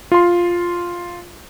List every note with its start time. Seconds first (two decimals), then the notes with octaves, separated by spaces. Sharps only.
0.12 F4 C6